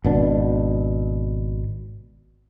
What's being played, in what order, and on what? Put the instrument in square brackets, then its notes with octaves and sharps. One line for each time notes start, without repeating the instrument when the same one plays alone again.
[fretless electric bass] G#1 B2 D4